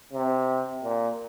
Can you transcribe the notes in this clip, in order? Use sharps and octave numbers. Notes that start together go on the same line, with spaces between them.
C3
A#2